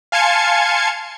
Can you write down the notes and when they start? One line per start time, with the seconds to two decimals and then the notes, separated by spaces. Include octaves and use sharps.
0.12 F5 G#5 A5 C6 G#6 C#7